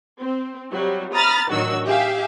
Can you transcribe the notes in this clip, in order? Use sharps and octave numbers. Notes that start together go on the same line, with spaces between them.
C4
C3 F#3 G3 F#4
A#5 B5 D#6 F6 A6
A1 D#3 F#3 D4 F#4 E6
G4 G#4 E5 F5